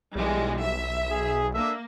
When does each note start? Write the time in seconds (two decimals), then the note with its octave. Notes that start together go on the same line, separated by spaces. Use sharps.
0.16 B1 E3 G3 G#3
0.61 E5
1.11 G#4
1.54 A#3 D4 A4 E5